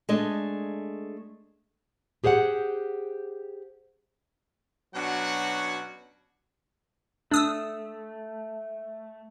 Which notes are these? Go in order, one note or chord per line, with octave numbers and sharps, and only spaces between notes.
G#3 A3 D4 D#5
G4 G#4 C5 F5 F#5
B2 F#3 C#4 D4 F#4 F#5
A3 D4 D#6 E6